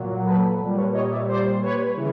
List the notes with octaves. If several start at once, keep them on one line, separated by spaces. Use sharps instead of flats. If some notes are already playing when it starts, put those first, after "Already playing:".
Already playing: A#2 F#3
A4 B4
A#2 G3
B4 C#5
C#5 D#5
D5 E5
C5 D5
B4 C#5
C#3 E3